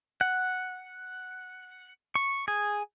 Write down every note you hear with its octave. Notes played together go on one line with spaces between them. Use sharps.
F#5
C#6
G#4